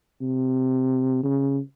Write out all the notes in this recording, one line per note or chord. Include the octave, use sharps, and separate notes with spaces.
C3
C#3